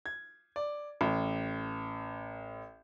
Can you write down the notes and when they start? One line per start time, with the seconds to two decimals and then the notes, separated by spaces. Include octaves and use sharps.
0.06 G#6
0.56 D5
1.01 A1